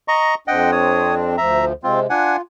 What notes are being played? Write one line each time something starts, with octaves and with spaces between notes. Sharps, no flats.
D#5 A#5 C#6
F2 C4 D4 D#5 F#5 G5
C#5 D#6
D2 F3 E5 A#5
C3 G#3 C4 F4
D4 F4 F#5 G#5